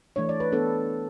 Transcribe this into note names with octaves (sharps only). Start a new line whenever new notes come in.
E3 A3 D4 C#5
D5
B4
B3 D4 A4